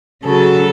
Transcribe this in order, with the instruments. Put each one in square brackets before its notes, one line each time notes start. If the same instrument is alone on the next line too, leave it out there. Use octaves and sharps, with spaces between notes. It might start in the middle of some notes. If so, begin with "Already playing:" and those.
[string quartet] C#3 F#3 A4